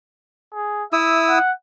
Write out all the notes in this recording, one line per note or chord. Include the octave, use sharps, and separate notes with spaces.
G#4
E4 E5 D#6 E6
F#5